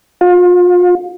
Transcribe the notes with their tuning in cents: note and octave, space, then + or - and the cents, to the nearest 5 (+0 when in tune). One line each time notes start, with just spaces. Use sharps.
F4 +35